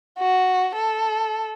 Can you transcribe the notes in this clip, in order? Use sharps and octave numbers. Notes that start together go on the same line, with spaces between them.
F#4
A4